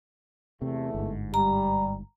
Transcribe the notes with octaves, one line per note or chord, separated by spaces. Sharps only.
E2 C3 A3
G1 G#2
G3 A#5